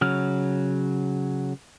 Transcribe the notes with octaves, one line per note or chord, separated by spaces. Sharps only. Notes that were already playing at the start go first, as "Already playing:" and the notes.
C#3 F#3 F6